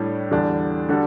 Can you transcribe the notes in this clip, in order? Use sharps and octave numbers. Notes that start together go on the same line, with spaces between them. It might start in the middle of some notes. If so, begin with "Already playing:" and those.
Already playing: A2 G3 D4 G4 C#5
E2 D3 G3 D4
D3 G3 D4 F#4 A4